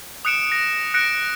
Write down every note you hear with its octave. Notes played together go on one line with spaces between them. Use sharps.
D#6 F#6 C#7 D7 E7
A#6
F#6 A#6 C#7 D7